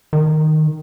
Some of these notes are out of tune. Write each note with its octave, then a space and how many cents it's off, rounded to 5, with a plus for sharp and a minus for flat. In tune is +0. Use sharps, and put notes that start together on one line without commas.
D#3 -5